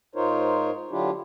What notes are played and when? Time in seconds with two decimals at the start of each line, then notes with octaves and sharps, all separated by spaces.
0.15 G#2 D#4 F4 A#4 C5 C#5
0.91 D3 F#3 D4 E4 F4 G4